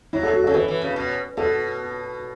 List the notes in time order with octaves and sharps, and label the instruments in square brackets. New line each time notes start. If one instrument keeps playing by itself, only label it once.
[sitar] F#3 [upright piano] E4
[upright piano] A4
F#4
A4
[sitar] C#3
[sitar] E3 [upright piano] B4
[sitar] E3
C#3
B2
[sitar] B2 [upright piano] A4